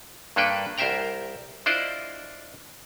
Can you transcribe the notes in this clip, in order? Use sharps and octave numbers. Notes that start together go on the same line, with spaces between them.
G2 A#3 D4 A4 B4 G5
C2 A#4 C5 E5 G5 A#5
D4 E4 F4 C5 D5 D#5